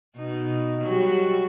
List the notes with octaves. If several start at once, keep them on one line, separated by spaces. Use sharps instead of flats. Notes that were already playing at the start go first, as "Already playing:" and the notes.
B2 D#4
F#3 G3 F#4